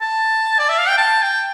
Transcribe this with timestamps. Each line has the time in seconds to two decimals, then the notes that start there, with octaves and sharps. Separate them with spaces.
0.01 A5
0.59 D5
0.69 E5
0.78 F5
0.88 G5
0.98 A5
1.22 G5